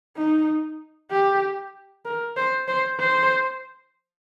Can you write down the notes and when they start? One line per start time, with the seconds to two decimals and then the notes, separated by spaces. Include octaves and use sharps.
0.17 D#4
1.11 G4
2.05 A#4
2.37 C5
2.68 C5
3.00 C5